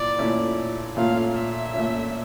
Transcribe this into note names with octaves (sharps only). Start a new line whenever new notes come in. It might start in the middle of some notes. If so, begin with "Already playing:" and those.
Already playing: A#2 E4 D5
A#2 A3 C#4 E4
A#2 A3 C#4 F4 F5
E5
A#2 A3 C#4 F4